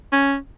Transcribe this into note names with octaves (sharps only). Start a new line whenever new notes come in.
C#4